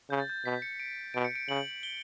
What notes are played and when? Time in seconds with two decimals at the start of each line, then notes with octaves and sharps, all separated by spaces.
0.10 C#3 G6
0.20 A6
0.30 G6
0.45 B2 B6
0.62 C#7
0.80 D7
1.14 B2 D7
1.25 C#7
1.35 D7
1.48 C#3 F#7
1.83 G7